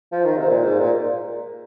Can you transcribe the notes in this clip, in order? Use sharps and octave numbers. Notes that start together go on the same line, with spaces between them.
F3
D#3
C3
A#2
G#2
A#2